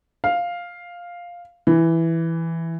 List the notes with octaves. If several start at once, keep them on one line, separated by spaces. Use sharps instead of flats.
F5
E3